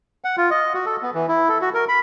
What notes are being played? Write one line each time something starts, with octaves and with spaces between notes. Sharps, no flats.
F#5
F4
D#5
F#4
A4
B3
E3
E4
A4
F#4
A#4
B5